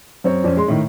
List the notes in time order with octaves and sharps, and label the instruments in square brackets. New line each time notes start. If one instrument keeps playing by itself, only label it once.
[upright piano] F#2 C4 C#5
F2 C4 C#4
G#3 C6
A2 D#3